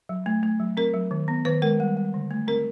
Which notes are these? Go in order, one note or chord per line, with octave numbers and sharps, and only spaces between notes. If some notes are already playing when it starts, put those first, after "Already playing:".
F#3
A3
A3
F#3
C4 A#4
F#3
D#3
B3
D#3 B4
G#3 A#4
G3
G3
D3
A3
C4 A#4